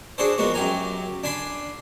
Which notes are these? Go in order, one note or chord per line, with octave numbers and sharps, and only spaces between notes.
D4 F#4 G#4 A4 C5
F3 G#3 A#3 B3 F#4
F#2 F#3 G4 G#5 A#5
D4 G#5 B5 C6